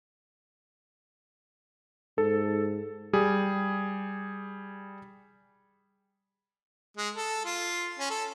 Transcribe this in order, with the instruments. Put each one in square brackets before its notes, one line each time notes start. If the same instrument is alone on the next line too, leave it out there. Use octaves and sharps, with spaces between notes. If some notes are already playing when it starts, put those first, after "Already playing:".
[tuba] G#2 [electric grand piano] A4
[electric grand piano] G3 G#4
[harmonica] G#3
A4
F4
C#4
A4